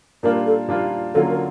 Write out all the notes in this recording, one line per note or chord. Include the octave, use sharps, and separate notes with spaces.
A#2 G3 A#3 D4 F4 A#4
A4
A#2 G3 A#3 D4 F4
D3 F#3 A#3 C#4 F4 A4
A#4